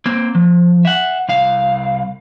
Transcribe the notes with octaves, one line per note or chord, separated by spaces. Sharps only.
A#3 C4
F3
E5 F#5
C2 F5